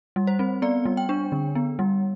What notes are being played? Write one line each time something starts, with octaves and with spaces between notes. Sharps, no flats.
G3
C5
C4
B3 D5
G3
G5
D4
D3
B3
G3